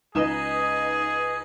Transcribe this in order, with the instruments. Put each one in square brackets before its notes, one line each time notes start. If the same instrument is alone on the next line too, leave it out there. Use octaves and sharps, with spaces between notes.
[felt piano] C#2 D#6 E7 [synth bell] D#4 B4 D#5 [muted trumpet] G#4